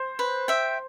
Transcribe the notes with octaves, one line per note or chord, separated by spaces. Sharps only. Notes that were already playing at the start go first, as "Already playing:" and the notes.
Already playing: C5
B4
E5 G5